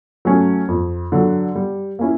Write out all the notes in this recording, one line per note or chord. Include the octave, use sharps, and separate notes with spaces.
F#3 A3 C#4
F2
D3 F#3
G3
A#3 C#4 E4